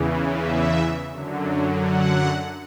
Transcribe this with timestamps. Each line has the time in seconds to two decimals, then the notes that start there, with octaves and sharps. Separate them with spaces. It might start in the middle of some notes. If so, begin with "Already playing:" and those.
Already playing: E2 C#3 E3
0.37 E5
1.10 F#2 D3 F#3
1.84 F#5